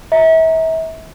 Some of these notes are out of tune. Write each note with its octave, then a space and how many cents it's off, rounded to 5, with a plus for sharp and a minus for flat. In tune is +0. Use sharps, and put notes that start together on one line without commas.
E5 -35 A#5 +0